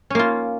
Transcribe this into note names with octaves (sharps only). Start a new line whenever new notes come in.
A#3 C#4 F4